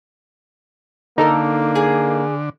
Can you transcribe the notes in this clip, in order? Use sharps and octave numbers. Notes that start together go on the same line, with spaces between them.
D3 A#3 D#4 A4 A#4
G#4